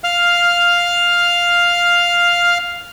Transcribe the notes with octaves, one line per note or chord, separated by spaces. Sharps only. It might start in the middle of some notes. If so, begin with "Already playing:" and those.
F5 F6